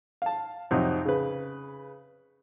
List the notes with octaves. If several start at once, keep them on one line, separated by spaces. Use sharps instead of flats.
F5 A5
F2 C3 F3 F#3 C4 D#4
C#3 B4